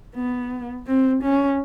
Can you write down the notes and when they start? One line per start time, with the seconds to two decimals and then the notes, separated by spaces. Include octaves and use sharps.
0.15 B3
0.87 C4
1.23 C#4